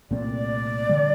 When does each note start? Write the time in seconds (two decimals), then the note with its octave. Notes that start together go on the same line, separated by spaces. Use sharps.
0.10 C2 A#2 A3 C4 D5
0.89 D3 G3